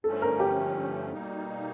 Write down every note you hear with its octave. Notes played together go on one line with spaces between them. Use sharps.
G2 D3 F3 A3 C#4 A4
A#4
G4
B2 G3 A#3 D#4